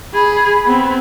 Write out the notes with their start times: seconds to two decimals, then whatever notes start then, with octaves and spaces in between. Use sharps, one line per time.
0.14 G#4 B5
0.66 B3 C4